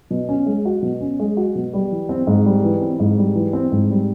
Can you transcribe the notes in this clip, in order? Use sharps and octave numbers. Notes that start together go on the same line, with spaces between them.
B2
C#4
G#3
F#4
B2
C#4
G#3
F#4
B2
G3
E3
C4
G#2
G3
E3
C4
G#2
G3
E3
C4
G#2
G3